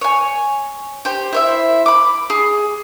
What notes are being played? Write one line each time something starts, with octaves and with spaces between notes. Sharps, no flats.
C#5 G#5
G4 C5
E4 C5 E5
B5 D6
G#4